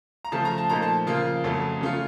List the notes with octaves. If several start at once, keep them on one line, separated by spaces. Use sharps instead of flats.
A#5
C#3 F3 A3 A5
A#5
A5
A#2 F3 A3 D#4 A#5
A5
C#3 F3 A#3 F4
F2 C#3 F#3 A3
C#3 A3 C#4 F4